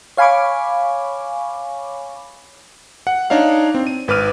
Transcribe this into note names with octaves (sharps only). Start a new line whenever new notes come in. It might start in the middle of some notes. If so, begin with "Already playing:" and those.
C#5 F5 G#5 B5 C#6 D6
F#5
D4 D#4 C#5 F5
C4
D#7
G#1 B4 D6 F6 D#7